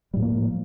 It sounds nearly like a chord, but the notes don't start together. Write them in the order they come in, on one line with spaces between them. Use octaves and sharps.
G3 A2 F3 A#3